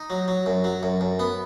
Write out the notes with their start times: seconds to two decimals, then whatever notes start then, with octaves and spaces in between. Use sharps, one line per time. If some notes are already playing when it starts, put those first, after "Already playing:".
Already playing: D#4
0.10 F#3
0.28 F#3
0.46 F#2
0.64 F#3
0.83 F#2
1.01 F#2
1.20 B3